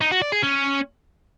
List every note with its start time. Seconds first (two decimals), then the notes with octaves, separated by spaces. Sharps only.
0.01 D#4
0.11 F#4
0.22 D5
0.32 G#4
0.42 C#4